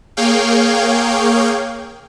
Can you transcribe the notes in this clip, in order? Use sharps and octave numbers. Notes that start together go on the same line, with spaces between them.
A#3 G#4 C#5 F5 G5